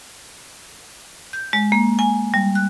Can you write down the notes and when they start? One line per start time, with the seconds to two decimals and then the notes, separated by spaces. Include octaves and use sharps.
1.33 G6
1.53 G#3
1.72 A#3
1.99 G#5
2.34 G3
2.55 F#6